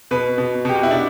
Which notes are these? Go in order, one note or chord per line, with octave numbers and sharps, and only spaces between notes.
B2 B4
B2
B2 G4
F#4
E4
B2 D4